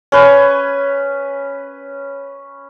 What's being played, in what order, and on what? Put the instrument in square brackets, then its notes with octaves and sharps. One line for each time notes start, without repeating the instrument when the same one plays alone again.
[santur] C#4 B4